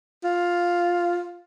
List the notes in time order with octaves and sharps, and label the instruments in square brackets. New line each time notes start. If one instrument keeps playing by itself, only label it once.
[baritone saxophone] F4